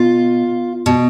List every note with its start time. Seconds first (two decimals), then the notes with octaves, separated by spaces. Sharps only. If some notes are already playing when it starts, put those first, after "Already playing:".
Already playing: B2 F4
0.86 B2